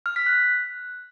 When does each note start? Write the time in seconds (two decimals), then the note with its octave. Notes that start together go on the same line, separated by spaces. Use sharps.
0.06 F6
0.16 B6
0.26 F#6